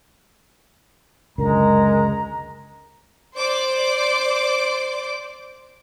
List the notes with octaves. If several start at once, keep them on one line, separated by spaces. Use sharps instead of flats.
C#2 F#2 D3 G#3 A#4 A#5
C5 D5 D6